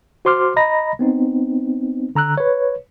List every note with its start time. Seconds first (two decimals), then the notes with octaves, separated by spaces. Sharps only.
0.25 F#4 C5 C6 D6 F6
0.57 D#5 A#5 B5 A#6
0.99 B3 C4 D#4
2.15 D3 A#5 E6 F#6
2.37 B4 C#5